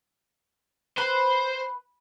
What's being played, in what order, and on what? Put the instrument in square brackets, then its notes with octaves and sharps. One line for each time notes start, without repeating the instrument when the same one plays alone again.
[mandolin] B4 [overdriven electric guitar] C5